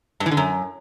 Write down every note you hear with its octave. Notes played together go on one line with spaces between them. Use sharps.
G2
E3
D3
F#2